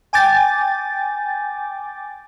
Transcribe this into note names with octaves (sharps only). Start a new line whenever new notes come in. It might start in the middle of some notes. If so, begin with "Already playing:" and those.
G5 G#5 D6 G6 A6